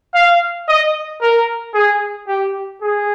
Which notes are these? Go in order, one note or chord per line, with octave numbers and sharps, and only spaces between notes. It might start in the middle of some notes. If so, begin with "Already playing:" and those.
F5
D#5
A#4
G#4
G4
G#4